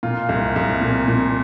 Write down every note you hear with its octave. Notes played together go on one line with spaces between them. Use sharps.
A#2 F4
C2
C2
A#2
A#2